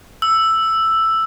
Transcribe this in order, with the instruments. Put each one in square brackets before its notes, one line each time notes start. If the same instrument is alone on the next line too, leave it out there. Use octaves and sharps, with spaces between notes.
[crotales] E6